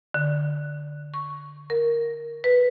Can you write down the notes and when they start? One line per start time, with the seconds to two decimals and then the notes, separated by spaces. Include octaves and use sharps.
0.14 D3
1.14 C#6
1.70 A#4
2.44 B4